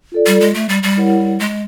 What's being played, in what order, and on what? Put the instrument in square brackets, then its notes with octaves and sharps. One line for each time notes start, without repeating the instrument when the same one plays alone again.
[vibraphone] F4 A4 D5
[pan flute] G3
G#3
A3
G3
G3
[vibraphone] E4 G4 A#4 C#5 F#5
[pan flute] G#3